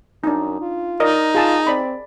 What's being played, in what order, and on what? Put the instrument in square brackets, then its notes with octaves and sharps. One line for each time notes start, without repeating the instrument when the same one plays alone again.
[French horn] F#2 [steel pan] D4 D#4
[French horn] F4
[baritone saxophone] D#4 [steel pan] A#4 D5 D#5
[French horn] F4 [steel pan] G#4 A5
[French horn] C4 [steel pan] D5 B5